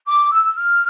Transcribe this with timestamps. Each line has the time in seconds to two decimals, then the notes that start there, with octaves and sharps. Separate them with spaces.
0.07 D6
0.31 E6
0.56 F6